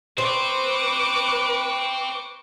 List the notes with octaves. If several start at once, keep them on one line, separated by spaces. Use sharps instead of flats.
C4 B4 C5 C#6 D6